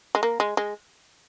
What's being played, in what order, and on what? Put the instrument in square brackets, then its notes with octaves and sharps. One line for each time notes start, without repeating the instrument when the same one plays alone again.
[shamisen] G#3
A#3
G#3
G#3